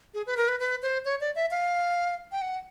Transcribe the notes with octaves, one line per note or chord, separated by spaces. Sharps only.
G#4
B4
A#4
B4
B4
C5
C#5
D5
E5
F5
G5
F#5